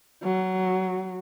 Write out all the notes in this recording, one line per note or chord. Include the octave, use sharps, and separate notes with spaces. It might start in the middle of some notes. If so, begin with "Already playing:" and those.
F#3